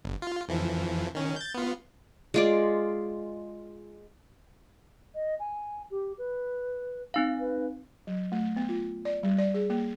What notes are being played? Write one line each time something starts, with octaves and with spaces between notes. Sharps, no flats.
G1
F4
F2 E3 F3
D#3 C#4
G6 A6
B3 F4
G#3 F4 D5
D#5
G#5
G4
B4
C4 D#4 F5
B4
F#3
A3
B3
F4
D5
G3
D5
G#4
A#3